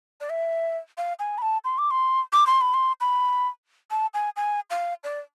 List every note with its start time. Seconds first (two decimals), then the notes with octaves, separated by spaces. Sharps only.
0.21 D5
0.30 E5
0.98 F5
1.19 G#5
1.38 B5
1.42 A5
1.65 C6
1.78 D6
1.91 C6
2.33 D6
2.47 C6
2.61 B5
2.74 C6
3.01 B5
3.91 A5
4.14 G#5
4.36 G#5
4.70 F5
5.04 D5